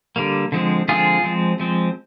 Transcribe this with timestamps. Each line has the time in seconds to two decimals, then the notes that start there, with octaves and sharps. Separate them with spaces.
0.16 D3 G3 A#3
0.52 D3 F3 G#3 C4
0.89 D3 F3 G#3 C4 F4 G#4
1.24 F3 G#3 C4
1.60 F3 G#3 C4